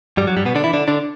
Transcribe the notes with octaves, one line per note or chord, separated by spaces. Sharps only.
G2 G3
F#3
G2 G3
B2 B3
D3 D4
E3 E4
D3 D4
D3 D4